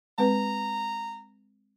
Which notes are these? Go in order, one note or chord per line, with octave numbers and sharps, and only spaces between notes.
G#3 C4 B4 A#5